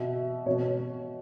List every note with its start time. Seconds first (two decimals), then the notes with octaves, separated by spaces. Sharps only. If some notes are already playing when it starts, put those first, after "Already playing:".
Already playing: B2 E5
0.46 B2 C#5